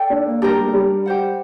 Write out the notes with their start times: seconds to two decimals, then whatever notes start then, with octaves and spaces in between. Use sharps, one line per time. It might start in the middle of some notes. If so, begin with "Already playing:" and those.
Already playing: A4 D5 G5
0.10 D4
0.26 A#3
0.42 G3 D4 G4 A#4
0.57 G3
0.67 A3
0.73 G3
1.06 G4 C5 F#5